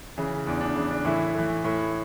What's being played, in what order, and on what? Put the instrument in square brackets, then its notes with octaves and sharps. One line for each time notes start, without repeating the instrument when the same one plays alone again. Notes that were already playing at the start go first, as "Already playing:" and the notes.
[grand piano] C#3 E3
E2 D4
D4
C#3 E3
D4
A2 E3 E4
E3 A3
A2